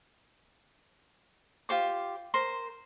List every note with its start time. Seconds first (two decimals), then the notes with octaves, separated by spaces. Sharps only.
1.69 F4 G4 C5 D6
2.34 A#4 C5 C6